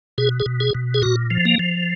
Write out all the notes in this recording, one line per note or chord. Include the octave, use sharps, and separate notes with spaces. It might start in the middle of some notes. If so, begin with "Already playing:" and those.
B2 G#4
G#4
B2
G#4
B2
G#4
A#2 F#4
F3
A#3
F3